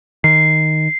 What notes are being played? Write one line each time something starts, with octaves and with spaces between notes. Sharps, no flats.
D#3 C7